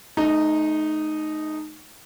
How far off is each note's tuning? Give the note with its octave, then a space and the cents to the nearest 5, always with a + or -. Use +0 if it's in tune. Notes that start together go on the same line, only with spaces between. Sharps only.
A3 -40 D#4 -10